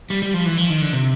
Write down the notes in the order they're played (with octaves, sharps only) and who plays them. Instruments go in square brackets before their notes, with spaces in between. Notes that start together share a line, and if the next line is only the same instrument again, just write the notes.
[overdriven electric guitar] G3
G3
F3
E3
F3
D#3
D3
C3